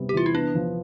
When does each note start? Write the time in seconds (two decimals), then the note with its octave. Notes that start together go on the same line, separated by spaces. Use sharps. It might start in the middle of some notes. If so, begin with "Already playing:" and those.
Already playing: C3 G3 B3
0.09 G4
0.13 E3 F4
0.26 E4
0.34 B3 D4
0.55 F3